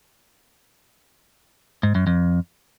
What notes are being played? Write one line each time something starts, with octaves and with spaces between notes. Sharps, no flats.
G#2
F#2
F2